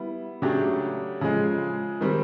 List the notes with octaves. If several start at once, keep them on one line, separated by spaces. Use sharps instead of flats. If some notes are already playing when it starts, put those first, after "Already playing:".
Already playing: G3 B3 E4
C#3 F#3 A3 D4 G4
C#3 F3 G#3
D#3 G3 C4